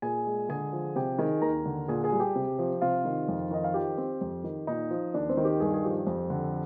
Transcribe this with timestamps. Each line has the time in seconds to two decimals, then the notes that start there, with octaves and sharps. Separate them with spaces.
0.02 A#2 G#4 G#5
0.26 G#3
0.49 D3 G#4 G#5
0.73 F3
0.96 C3 G4 G5
1.19 D#3 G#4 G#5
1.42 D#2 A#4 A#5
1.66 D3
1.88 A#2 G#4 G#5
2.04 G#4 G#5
2.12 G3
2.20 G4 G5
2.35 C3
2.59 F3
2.81 C3 F4 F5
3.05 D#3
3.28 F2
3.51 D#3 D#5
3.64 F5
3.74 F3 G4 G5
3.98 C4
4.21 F2
4.44 D#3
4.67 A#2 D#4 D#5
4.91 F3
5.14 D#2 D4 D5
5.29 C4 C5
5.37 D#3
5.45 G4
5.60 G2 G#4
5.74 G#4
5.84 F3 G4
6.07 F2
6.30 D3